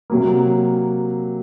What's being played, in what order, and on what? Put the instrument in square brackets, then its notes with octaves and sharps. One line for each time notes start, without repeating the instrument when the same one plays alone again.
[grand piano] C3 F#3 A#3